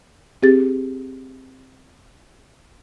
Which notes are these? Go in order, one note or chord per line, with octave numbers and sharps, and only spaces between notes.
C4 G4 G#4 A6